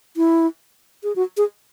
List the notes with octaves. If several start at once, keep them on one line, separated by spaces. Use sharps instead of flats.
E4
G#4
F#4
G#4